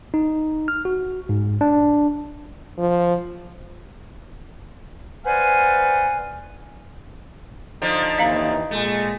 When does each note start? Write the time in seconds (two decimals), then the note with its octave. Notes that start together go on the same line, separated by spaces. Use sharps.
0.14 D#4
0.68 F6
0.85 F#4
1.29 G#2
1.61 D4
2.79 F3
5.25 B4 C5 D5 F5 F#5 G#5
7.82 D3 F3 D#4
8.18 D#2 C3 E3 D#5 F5 A#5
8.71 A#2 G#3 A3